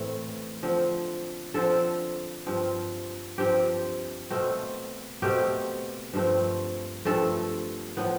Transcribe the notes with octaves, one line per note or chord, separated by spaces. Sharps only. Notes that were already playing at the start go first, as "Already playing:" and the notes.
Already playing: A2 E3 A3 C4
D3 F3 C4
D3 F3 C4 A4
G2 F3 C4
G2 F3 C4 G4
B2 A3 C4
B2 A3 C4 G4
G2 F3 A3 C4
G2 F3 A3 C4 A4
A2 F3 B3